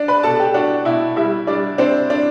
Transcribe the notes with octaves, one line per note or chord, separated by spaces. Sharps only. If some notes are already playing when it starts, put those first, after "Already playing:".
Already playing: D4
B4 B5
B2 A4 A5
G4 G5
D4 F#4 F#5
B2 E4 E5
G3 E4 E5
G3 D4 D5
C4 D4 C5
D4